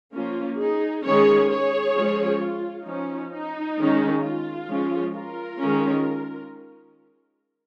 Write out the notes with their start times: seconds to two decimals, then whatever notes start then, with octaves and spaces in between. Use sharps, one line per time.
0.14 F3 A#3 C#4 F4
0.59 D#4 G#4
1.05 D#3 G#3 C#4 G#4 C#5
1.51 G#4 C#5
1.96 F3 G#3 C#4
2.42 F4
2.87 F3 C#4 D#4
3.33 D#4
3.79 D#3 G#3 C#4
4.24 F4
4.69 F3 G#3 C#4
5.15 F4 A#4
5.60 D#3 G#3 C#4